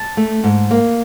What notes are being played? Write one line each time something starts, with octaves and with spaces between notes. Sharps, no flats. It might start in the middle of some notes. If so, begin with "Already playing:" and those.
Already playing: A5
A3
G#2
A#3